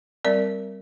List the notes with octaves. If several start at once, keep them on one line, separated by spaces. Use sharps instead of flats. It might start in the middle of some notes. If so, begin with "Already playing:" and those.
G3 C4 A#4 D5